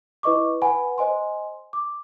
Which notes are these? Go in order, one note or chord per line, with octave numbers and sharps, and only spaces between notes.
E4 B4 D#5 C#6 D6
B4 F#5 G#5 B5
C5 D#5 G#5 C6
D6